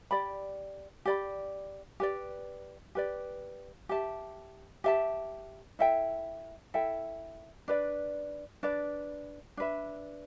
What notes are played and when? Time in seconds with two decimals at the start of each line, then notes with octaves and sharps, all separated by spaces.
0.11 G4 D5 B5
1.05 G4 D5 B5
2.00 G4 B4 D5
2.95 G4 B4 D5
3.89 G4 E5 A5
4.84 G4 E5 A5
5.79 E4 A4 E5 G5
6.74 E4 A4 E5 G5
7.68 D4 B4 D5
8.63 D4 B4 D5
9.57 D4 B4 E5